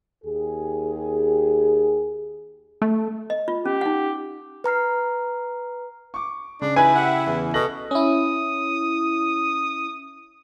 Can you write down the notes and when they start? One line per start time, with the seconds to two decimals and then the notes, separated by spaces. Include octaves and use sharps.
0.24 D#2 G4 G#4
2.82 A3
3.30 D#5
3.48 F4
3.65 C#4 G4
3.81 D#4 F#5
4.64 B4 A#5 F6 C7
6.14 C#6 D6
6.61 C#3 D4
6.76 D#4 E4 B4 G#5
6.96 G4 E5 F#5
7.26 E2 E3
7.54 B2 A4 A#6 F#7
7.91 C#4 E4 D#6